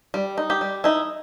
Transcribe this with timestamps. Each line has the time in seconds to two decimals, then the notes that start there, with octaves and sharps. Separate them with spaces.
0.14 G3
0.38 D#4
0.50 G4
0.61 G3
0.84 D#4 E4